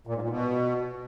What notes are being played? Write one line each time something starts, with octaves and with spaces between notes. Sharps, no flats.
A#2
G#2
A#2
B2